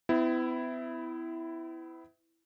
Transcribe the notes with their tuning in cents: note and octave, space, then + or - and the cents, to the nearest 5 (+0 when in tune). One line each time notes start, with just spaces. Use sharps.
B3 +45 E4 +0